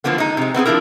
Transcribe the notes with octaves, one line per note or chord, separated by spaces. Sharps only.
D3 E3 F3 A#3 B3
G#3 D#4
C3 G#3
B3 C4 F4 G#4
F3 G3 D4 E4 A#4